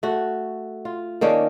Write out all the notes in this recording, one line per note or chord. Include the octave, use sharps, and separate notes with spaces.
A3 F#4
F4
D#3 A#3 C#4 D4